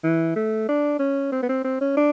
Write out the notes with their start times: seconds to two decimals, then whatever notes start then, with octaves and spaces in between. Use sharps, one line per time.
0.04 E3
0.36 A3
0.68 D4
0.99 C#4
1.32 C4
1.43 B3
1.49 C4
1.64 C4
1.81 C#4
1.97 D4